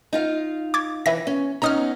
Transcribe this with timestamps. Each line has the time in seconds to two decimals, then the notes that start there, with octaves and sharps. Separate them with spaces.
0.13 D#4 F4 F5
0.74 D6 G#6 A6
1.06 E3 B4 E5 A#6
1.27 C#4
1.62 B3 C#4 D#4 A#5 D#6 F6